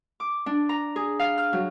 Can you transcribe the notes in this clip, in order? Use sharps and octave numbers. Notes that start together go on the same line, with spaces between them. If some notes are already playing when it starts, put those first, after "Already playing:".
D6
D4
A#5
G#4
F5
F6
F#3